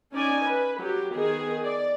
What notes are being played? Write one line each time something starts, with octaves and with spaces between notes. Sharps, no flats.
C#4 D#4 D5 G#5
B4
F#3 G4
D#3 B3 G#4
D5